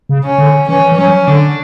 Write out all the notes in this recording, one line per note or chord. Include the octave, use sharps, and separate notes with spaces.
C#3
C#4
D3
E3 C#4
E3
F#3 C#4
D3 D4